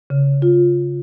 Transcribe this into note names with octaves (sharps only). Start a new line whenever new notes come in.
C#3
F4